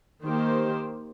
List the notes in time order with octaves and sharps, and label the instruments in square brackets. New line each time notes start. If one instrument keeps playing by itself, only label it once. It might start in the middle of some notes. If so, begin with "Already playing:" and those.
[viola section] D#3 A#3 G4 C5